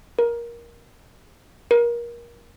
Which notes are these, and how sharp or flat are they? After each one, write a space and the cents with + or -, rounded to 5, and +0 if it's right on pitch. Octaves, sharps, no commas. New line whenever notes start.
A#4 +15
A#4 +25